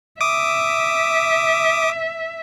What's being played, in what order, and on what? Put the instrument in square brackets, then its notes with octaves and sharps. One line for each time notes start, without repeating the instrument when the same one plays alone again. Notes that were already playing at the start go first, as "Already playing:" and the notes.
[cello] E5 [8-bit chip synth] D6 D#6